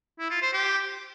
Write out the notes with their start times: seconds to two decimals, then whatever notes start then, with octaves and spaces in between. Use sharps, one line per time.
0.19 E4
0.31 F4
0.42 C5
0.53 G4